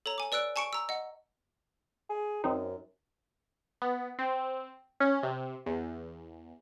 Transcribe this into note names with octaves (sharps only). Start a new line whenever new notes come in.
A4 C#5 A#5
G#5 D6
B4 D5 E6 F#6 D7
G#5 A5 C#6 C#7 D7
A#5 E6
D#5 F#5
G#4
F#2 C4 D#4
B3
C4
C#4
C3
E2